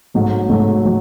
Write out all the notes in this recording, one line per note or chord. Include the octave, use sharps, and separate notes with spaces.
G#2 F#3 A3
G#2 F#3 A3
F#3